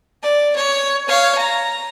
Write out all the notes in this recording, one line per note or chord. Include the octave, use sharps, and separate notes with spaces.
D5
C#5
C#5 F5
A#5